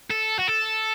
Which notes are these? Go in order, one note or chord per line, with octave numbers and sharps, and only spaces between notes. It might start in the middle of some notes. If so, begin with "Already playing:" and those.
A4
F#4
A4